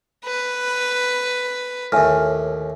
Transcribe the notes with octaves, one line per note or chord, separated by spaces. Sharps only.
B4
D#2 A2 E5 G#5 F6